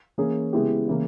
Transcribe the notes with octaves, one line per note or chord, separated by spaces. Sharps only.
E3 A#3 C#4 G#4
C#3 G#3 B3 E4 G4
C#3 E3 A#3